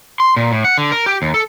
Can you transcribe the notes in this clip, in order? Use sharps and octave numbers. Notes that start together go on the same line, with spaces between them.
C6
A#2
A2
F#5
D3
A#4
G4
D#2
A4